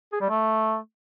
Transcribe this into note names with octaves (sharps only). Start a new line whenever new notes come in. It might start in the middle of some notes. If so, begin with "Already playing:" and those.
G#4
G3
A3